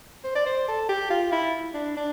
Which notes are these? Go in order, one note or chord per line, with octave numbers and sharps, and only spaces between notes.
C5
D5
C5
A4
G4
F4
E4
D4
D4